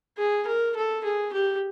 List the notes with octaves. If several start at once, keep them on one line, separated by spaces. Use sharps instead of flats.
G#4
A#4
A4
G#4
G4